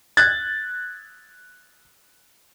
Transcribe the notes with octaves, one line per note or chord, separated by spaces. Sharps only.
F#6 G#6 A6